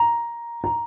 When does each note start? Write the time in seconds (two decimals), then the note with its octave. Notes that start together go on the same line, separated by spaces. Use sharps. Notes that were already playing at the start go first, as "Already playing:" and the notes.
Already playing: A#5
0.64 A#5